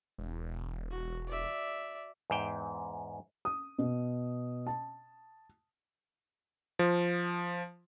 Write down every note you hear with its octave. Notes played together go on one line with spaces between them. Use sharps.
E1
F#4
D5 E5
E2 G#2 G5
D#6
B2
A5
F3